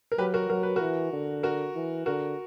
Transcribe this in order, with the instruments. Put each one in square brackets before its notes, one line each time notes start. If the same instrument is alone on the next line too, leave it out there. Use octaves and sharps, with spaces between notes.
[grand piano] A#4
[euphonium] F#3 [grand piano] G4 B4
[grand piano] F#4 A#4
[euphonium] F#3 [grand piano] A#4
[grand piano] B4
[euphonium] E3 [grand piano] F#4 A#4
[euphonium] D3
[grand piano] F#4 A#4
[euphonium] E3
[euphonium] D3 [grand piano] F#4 A#4